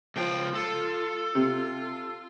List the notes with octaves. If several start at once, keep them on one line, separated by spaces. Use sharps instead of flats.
C#2 F3 G5
F4 A4
C3 F4